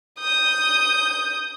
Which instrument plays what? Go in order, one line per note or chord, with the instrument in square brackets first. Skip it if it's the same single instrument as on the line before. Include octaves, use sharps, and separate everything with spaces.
[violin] D#6 G6